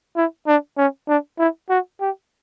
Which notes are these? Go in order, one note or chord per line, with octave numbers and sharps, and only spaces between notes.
E4
D4
C#4
D4
E4
F#4
G4